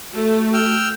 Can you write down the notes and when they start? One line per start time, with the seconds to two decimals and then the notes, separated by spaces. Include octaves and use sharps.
0.14 A3 F#4
0.54 G5 E6 F6